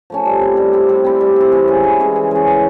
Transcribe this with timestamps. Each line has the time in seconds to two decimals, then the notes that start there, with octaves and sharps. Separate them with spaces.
0.10 F3 A3 C#4
0.26 G3
0.41 C4 E4
0.57 G3
0.73 C4 E4
0.89 G3
1.05 C4 E4
1.21 G3
1.36 C4 E4
1.52 E3
1.68 G#3 C#4
1.84 E3
2.00 G#3 C#4
2.16 E3
2.31 G#3 C#4
2.47 E3